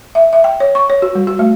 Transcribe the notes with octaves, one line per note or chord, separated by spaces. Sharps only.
E5
E5
G5
C#5
C#6
C#5
F#4
G3
F#4
A3